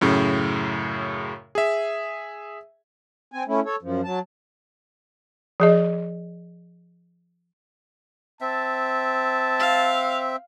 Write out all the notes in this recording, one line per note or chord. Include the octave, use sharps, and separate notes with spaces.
F#2 A2 C#3
G#4 E5
C4 G#5
A3 C#4 E4
A4 C#5
F#2 F3
F#3 A5
F3 G#4 D#5
C4 E5 A5
F5